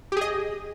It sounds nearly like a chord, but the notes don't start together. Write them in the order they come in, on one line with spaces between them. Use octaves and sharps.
G4 G#4 D#5